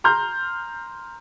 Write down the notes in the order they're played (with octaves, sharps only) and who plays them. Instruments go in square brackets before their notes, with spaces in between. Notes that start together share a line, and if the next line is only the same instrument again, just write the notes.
[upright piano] A#5 C6 F6 G6